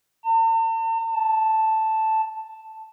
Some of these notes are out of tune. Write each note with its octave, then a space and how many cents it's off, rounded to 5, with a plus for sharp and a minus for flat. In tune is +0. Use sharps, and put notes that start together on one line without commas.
A5 +45
A5 +0